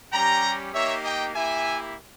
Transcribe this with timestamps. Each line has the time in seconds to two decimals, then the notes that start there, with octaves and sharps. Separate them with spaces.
0.12 G3 C#4 G4 G5 A#5
0.73 A#3 D#4 G4 C#5 E5
1.04 D#5 G5
1.34 A#3 E4 G4 E5 G#5